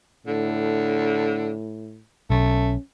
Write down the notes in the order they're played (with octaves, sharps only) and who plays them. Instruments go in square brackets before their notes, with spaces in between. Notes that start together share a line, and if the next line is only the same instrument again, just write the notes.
[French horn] A2 [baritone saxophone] D3
[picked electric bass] B1 [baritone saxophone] A3 [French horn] C#4